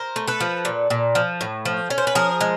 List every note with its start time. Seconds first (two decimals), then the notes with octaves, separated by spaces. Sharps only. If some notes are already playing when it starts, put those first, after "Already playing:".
Already playing: A#4 C5
0.16 A3
0.27 A4 B4
0.40 F3
0.65 A#2
0.90 A#2
1.15 F3
1.41 A2
1.65 F3
1.90 C#4
1.98 C5
2.07 B4
2.15 F3 G#4 A#4
2.41 G#3